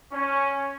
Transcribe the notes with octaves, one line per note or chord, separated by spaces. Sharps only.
C#4